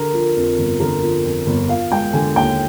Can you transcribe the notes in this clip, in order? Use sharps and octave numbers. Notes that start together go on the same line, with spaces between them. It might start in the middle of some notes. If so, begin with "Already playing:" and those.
Already playing: D3 A#4
F3
F2
G1
D3 A#4
F3
F2
G1
F3 F5
G#3 G5
D3 G#5
D#2 G5